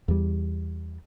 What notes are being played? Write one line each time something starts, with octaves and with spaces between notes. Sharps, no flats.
E2 G3